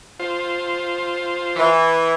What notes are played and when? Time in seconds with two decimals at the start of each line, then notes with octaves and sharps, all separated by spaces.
0.20 F4 C5
1.57 E3